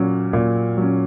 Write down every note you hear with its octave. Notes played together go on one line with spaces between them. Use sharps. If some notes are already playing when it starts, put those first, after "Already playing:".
Already playing: A#2 F#3 C#4
A#2
F#3 C#4